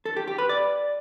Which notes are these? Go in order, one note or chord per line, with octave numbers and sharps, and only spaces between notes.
A4
G4
G4
B4
D5